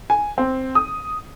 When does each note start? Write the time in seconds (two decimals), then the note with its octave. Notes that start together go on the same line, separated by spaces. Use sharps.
0.10 G#5
0.38 C4
0.75 D#6